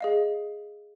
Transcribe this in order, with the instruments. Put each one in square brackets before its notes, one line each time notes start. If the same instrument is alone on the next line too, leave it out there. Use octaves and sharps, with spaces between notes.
[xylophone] G#4 D#5 F5